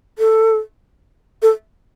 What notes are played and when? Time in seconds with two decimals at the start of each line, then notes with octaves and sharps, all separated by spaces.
0.19 A4
1.42 A4